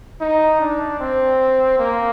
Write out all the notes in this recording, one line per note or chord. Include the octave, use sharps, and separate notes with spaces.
D#4
D4
C4
A#3